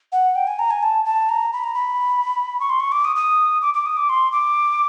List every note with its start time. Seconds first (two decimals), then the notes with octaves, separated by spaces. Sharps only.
0.12 F#5
0.36 G5
0.47 G#5
0.59 A#5
0.71 G#5
0.83 A5
1.05 A5
1.29 A#5
1.53 B5
1.64 A#5
1.75 B5
2.60 C#6
2.70 C6
2.80 C#6
2.92 D6
3.05 D#6
3.16 D#6
3.62 D6
3.74 D6
3.86 D#6
3.97 D6
4.09 C6
4.32 D6